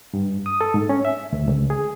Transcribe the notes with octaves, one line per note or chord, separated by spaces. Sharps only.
G2
D#6
A4
G#2
C#4
E5
D2
C#2
G#4